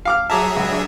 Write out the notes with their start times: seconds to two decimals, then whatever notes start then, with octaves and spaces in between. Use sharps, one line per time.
0.05 F5 D6 F6
0.30 F#3 G#4 E5 A5 A#5 D6
0.56 C#2
0.72 D4